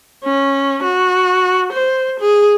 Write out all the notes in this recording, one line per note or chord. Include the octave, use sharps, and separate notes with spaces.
C#4
F#4
C5
G#4